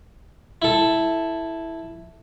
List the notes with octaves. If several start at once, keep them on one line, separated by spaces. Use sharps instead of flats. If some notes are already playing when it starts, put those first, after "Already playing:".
E4 A4